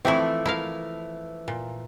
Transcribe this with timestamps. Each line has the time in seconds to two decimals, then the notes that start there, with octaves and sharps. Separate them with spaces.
0.05 E3 F3 A3 C4 E4
0.46 E4 A#4 F5
1.48 A#2